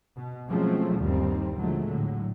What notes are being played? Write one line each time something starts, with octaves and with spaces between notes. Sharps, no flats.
B2
F3 F#3 G#3 A3 C4 C#4
G1 D#2 D3 D#3 G3 C4
A#1 D3 F3 F#3 G#3 A3
A2 D3 F#3